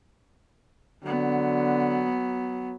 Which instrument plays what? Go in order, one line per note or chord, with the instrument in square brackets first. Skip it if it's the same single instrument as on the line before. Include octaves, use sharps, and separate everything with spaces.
[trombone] D3 [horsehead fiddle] F#3 B3